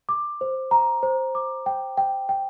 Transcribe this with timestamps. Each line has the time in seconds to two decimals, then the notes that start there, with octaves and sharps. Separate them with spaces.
0.09 D6
0.41 C5
0.71 A#5
1.03 C5
1.35 D6
1.66 G5
1.97 G5
2.29 G5